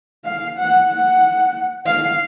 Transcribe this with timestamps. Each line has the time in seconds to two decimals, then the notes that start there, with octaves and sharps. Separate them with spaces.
0.24 F5
0.57 F#5
0.89 F#5
1.86 F5